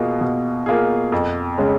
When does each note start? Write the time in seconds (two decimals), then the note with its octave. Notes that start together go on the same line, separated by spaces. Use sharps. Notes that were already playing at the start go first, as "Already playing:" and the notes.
Already playing: B2 A#3 F4 G#4
0.21 B2
0.66 A#3 F4 G#4
1.12 F2
1.58 C#3 G#3 C#4